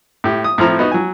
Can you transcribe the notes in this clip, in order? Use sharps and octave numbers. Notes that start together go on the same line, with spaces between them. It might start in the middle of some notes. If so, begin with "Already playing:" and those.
A2 G4
D#6
A2 F3 C4 A#5
B3 D#4 F#4
F#3 G#5